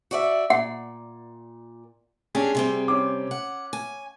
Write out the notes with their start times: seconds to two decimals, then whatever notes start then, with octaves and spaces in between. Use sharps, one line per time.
0.11 F#4 D5 E5
0.50 A#2 F#5
2.35 C#4 D4 G4 G#4
2.55 C3 G3 C4
2.88 C#4 D6
3.31 F#5
3.73 G#5